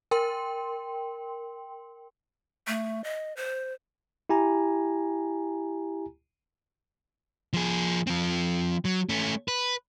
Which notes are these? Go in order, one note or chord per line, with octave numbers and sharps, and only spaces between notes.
A#4 G5 C6
A3
D#5
C5
E4 G4 G#5 A#5
F3 G#4
F3 C4
F#3
A3 C#4
B4